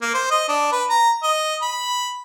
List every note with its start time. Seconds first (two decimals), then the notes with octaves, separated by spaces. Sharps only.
0.02 A#3
0.14 C5
0.31 D#5
0.49 D4
0.72 B4
0.90 A#5
1.23 D#5
1.62 B5